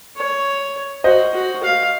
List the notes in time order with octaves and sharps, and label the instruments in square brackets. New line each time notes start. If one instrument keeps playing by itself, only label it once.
[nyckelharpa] C#5
[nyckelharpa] F#4 [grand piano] C5 D#5
[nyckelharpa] F#4
F5